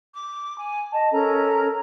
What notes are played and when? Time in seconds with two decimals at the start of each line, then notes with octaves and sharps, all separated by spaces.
0.13 D6
0.59 G#5
0.92 D#5 A5
1.12 C#4 A4 A#4 A#5